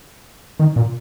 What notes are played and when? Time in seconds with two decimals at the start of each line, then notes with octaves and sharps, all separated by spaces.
0.59 D#3
0.76 A#2